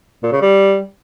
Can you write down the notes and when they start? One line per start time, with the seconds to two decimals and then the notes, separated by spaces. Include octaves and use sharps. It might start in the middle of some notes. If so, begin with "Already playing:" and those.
0.23 A#2
0.32 C#3
0.41 G3